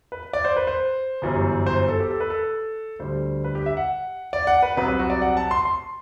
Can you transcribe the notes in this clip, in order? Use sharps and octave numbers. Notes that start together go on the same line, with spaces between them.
B4
D5
C5
B4
C5
G1 F#2 E3 G3
C5
A4
G4
A4
B4
A4
D2 D3 G3 C5
B4
G4
E5
F#5
D5
F#5
B4
C2 C3 F#3 B4
B4
F#4
D5
F#5
A5
C6
C6